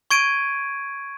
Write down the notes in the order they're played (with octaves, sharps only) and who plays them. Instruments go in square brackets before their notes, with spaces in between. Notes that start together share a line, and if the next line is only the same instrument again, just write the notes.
[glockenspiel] C#6 G#6 D7 D#7